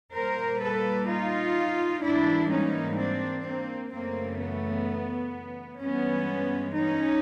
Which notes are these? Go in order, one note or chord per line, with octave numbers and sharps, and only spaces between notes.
A#2 G3 A#3 A#4 C5
A4 B4
D#4 F4
G#2 E3 G3 A#3 D4 E4
C#4 D#4
C4 D4
A#3 C4
F#2 C#3 E3 A3 A#3 C4
B3
G2 E3 G#3 B3 C#4
C#4 D#4